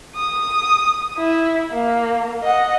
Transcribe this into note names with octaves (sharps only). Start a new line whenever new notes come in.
D#6
E4
A#3
D#5 F#5